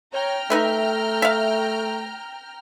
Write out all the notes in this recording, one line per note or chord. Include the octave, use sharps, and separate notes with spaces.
C#5 G5 A#5 F6
A3 D#4 B4 E5
E5 F5